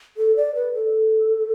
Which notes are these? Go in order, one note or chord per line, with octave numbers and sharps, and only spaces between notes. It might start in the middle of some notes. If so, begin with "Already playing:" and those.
A4
D5
B4
A4